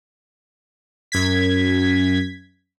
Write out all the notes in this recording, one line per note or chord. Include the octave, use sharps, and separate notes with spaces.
F#2 G#6 B6